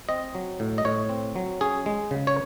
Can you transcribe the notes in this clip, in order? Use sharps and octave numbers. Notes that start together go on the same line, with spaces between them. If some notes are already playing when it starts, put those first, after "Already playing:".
C4 D#5
F#3
A2
D#5
A2 C#5
C4
F#3
C#4 G#4
G#3
C#3
C#5